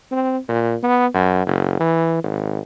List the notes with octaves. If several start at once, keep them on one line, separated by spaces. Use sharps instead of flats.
C4
A#2
B3
F#2
F#1
E3
G#1